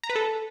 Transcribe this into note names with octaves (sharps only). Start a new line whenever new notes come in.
A#5
B4
A4